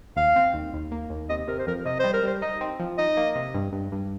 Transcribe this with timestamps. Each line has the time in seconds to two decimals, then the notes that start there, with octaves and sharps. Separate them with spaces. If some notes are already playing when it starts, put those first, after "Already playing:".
0.16 D#2 F5
0.36 C4
0.54 D#2
0.73 D#2
0.92 A#3
1.10 D#2
1.29 C3 D#5
1.47 C3 A#4
1.59 C5
1.67 F2 A#4
1.85 C3 D#5
1.99 G3 C5
2.13 A#4
2.23 G3 C5
2.42 D#4 D#5
2.61 C4
2.79 F3
2.98 D#4 D#5
3.17 A#3
3.35 C3
3.54 G2
3.73 G2
3.92 G2